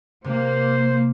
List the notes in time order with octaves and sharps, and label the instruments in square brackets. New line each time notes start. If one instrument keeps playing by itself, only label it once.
[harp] C3 [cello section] A#3 [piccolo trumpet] C5